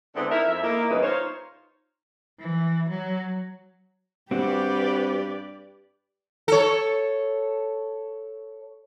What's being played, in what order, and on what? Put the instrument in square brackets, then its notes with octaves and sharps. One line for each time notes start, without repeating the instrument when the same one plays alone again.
[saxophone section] G#2 D3 B3 C4 D4 E4
D#4 E4 A#4 E5
F2 E5
A#3 D#4 E4
E2 G2 A#2 C#3 B4 D#5
D#4 F4 C5 C#5
[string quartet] E3
F#3
[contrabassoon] G2 [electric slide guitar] C4 F#4 [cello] G4 [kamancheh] B4 D5
[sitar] A4 C#5